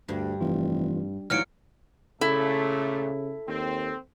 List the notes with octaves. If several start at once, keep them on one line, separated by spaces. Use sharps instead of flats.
D2 G2
F1 E3 F4
D2 E3 F#3 D#4 F4 F6 C#7 D7
A#2 C#3 A3 E4 A4
D#2 C4